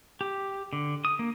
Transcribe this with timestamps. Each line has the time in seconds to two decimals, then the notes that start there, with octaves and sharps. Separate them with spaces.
0.21 G4
0.73 D3
1.05 D#6
1.19 A#3